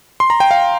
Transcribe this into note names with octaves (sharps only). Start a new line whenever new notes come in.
C6
A#5
G5
F5